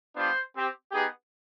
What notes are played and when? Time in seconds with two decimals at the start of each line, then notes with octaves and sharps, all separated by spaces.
0.16 G3 B3 D4 F4 C5
0.54 C4 G4
0.92 B3 D#4 G4 G#4